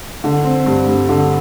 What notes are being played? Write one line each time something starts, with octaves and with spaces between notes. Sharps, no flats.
D3
C4
G2
G2
D3